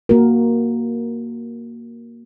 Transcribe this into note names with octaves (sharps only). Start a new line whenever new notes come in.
A#3 F#4 A#4